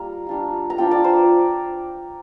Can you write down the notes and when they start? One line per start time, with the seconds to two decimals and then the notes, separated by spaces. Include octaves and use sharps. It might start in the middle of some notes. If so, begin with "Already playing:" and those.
Already playing: G3 A#3 F4 A#5
0.27 G3 D4 F4
0.70 A#5
0.78 F3 D4 F4 G5
0.91 D5
1.04 C5